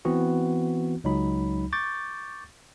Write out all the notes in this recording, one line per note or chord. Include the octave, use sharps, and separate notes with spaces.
E3 B3 C4 F#4
C#2 F#3 D#4 B5
C#6 D6 G6 A6